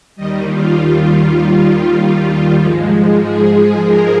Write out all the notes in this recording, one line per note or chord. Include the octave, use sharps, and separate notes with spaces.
D#2 D#3 G3 D#5
F4
F4
G#2 F3 G#3
G#4
A#4